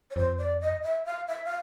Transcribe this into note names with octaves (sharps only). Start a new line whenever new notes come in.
C#5
F2 C5
D5
D#5
E5
F5
E5
F5